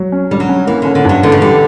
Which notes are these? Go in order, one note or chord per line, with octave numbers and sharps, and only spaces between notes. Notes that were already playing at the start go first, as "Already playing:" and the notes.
Already playing: F#3
C#4
D3 G3
F#3
C#4
E3 A#3
D3 C#4
D3
G2 F#3
D3 E3
C#3
D3 G3